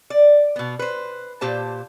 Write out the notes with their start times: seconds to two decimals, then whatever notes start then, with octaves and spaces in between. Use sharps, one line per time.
0.10 D5
0.56 B2 B3
0.79 B4 C5
1.41 A#2 G4 C5 A5